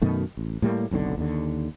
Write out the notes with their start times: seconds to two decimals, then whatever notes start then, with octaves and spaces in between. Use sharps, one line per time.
0.02 F#2 B2 D#3 A3
0.37 A1
0.62 A2 G3 A#3
0.91 F#1 B1 A2 D3
1.18 D#2 D3